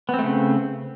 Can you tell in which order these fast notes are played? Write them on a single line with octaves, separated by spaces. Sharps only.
B3 C4 A3 C#3